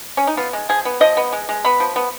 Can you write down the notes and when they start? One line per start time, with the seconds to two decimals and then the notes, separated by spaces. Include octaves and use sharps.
0.17 C#4
0.27 D#4
0.37 B3 F4
0.53 G#3
0.69 F3 G#4
0.85 B3
1.00 F3 D#5
1.17 B3
1.32 G#3
1.49 G#3
1.65 B3 B5
1.80 F3
1.96 B3